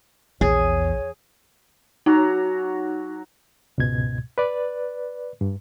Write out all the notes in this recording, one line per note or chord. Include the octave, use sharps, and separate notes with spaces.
A#1 E2 G#4 C#5
F#3 D#4 F#4 A#5
C#2 G#2 B2 G#6
B4 D5
G2